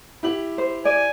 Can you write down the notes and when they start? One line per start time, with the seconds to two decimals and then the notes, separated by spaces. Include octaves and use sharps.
0.23 E4 G4 F#7
0.58 C5
0.85 D5 G#5